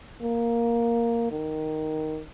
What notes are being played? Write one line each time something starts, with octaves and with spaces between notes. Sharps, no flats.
A#3
D#3